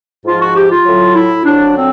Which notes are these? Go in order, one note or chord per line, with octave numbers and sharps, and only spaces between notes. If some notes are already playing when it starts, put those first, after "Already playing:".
G#2 F3 F4
F#4
G4
F4
A2 F#3
E4
F2 D3 F#3 D4
C4